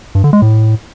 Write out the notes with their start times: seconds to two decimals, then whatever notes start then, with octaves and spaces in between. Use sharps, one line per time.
0.15 G2
0.24 D3
0.33 G#3
0.42 A2